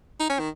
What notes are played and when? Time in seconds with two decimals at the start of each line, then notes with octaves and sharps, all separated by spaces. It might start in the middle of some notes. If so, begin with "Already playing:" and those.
0.20 D#4
0.30 C#4
0.39 D#3